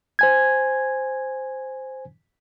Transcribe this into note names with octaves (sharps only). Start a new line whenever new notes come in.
C5 G#5 G#6